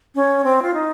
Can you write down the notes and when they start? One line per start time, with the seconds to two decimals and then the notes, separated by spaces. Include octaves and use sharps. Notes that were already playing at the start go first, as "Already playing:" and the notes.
0.15 C#4
0.44 C4
0.62 F4
0.74 D#4